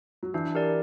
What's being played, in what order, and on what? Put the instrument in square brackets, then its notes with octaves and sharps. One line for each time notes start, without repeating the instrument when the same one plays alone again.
[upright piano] F#3
[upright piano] E3 [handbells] D4
[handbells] G4 A#4 D5